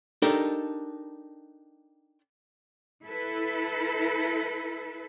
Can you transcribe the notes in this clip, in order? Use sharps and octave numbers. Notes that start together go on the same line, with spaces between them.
D4 D#4 G4 A4 A#4
E4 A4 B4